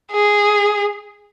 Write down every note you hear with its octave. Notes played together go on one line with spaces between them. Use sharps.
G#4